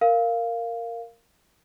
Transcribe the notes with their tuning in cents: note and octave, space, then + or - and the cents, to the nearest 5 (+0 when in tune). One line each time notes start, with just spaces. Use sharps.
A#4 -10 F5 -5